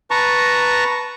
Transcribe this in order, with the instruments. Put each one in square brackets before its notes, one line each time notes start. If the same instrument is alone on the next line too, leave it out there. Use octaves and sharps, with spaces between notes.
[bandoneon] B4 A5 A#5 C#6